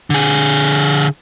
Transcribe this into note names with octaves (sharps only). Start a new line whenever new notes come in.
D3 G#4